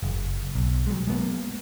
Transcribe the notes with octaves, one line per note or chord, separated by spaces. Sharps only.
F#1
B1
F#3 G#3
G#3 A#3 B3